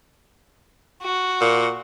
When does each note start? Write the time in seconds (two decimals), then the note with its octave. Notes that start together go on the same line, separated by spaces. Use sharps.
1.02 F#4
1.41 A#2